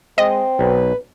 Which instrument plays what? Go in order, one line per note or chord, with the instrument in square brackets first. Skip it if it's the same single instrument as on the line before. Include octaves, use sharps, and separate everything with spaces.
[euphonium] G#3 [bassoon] C4 [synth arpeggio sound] D#5
[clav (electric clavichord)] B1 [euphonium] B4